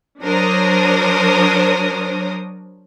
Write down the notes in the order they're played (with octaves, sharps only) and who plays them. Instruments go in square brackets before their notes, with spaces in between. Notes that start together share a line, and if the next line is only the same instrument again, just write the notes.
[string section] F#3 D4 A#4 C5 C#5 D#6